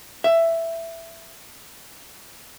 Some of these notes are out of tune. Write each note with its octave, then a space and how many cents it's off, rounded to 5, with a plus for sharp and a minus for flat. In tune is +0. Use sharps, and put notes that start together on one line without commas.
E5 +10